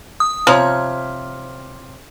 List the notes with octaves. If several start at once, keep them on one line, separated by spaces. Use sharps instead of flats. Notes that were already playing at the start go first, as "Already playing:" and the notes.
D#6
C3 F3 C#5 A#5 F6